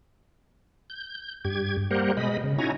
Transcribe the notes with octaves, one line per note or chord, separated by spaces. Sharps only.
G6
G2 G4 G#6
G3 A#3 G4 A#4 C5 F#5
B2 G#3 D#5 B5
C#3
C#4 D#4 E4 F#4 G#5 A#5